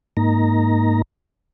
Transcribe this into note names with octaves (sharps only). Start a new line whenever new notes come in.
G#2 A#3 D#4 A#5